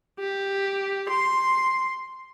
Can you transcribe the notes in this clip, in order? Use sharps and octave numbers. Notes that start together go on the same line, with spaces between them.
G4
C6